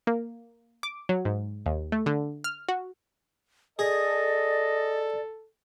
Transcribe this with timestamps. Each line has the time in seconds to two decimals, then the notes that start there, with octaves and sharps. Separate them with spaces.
0.07 A#3
0.83 D6
1.09 F#3
1.25 G#2
1.66 D#2
1.92 A3
2.06 D3
2.44 F6
2.69 F#4
3.79 G#4 A4 D5 D#5